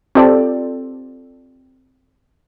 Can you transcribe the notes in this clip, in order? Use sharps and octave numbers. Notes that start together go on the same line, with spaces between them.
C4 F4 G4 A4 D5